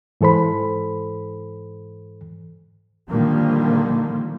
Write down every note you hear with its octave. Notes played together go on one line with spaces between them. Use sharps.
G#2 E3 A4 C5 B5
A#2 D3 D#3 F3 G3 A#3